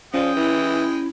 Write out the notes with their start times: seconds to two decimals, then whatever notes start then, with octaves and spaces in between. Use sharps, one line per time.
0.14 F3 G#3 C#4 D5 G5 D#6
0.37 E3 E4